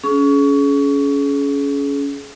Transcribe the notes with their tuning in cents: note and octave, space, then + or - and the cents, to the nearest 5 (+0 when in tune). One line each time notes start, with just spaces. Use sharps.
C#4 +25 G#4 +35